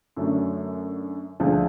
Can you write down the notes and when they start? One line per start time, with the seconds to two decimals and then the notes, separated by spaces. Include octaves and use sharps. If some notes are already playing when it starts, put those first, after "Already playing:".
0.17 F#2 D3 F#3 A3
1.40 D2 D3 F3 G#3